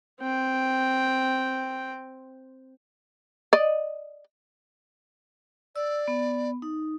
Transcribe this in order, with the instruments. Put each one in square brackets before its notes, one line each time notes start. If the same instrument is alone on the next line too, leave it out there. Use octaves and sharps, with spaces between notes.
[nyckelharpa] C4 G5
[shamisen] D5 D#5
[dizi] D5 [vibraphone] E6
[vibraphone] B3
D#4